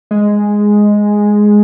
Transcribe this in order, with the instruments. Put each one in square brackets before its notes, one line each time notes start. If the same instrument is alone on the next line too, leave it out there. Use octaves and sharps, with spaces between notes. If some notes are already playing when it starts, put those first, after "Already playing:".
[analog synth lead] G#3